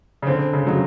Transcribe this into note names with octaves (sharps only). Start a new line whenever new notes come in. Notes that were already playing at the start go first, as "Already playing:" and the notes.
C#3
D3 C4
C#3
C#3 F#3